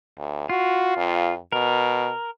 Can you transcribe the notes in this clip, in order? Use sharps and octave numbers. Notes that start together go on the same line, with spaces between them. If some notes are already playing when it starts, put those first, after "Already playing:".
D2
F4 F#4
F2
B2 A#4